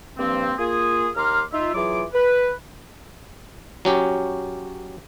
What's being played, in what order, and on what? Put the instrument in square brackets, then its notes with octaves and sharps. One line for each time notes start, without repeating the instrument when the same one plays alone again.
[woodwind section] G2 F3 A#3 C4
A#3 F4 G#4
D#2 A#5 C6 D6 F6
D#4 F4 E5
E3 F#3 F4 G#4 D6
B4
[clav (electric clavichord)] F#3 C#4 G4